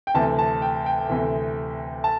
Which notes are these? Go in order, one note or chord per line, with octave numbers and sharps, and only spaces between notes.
G5
D2 C3 E3 A5
A5
G5
G5
D2 C3 E3
A5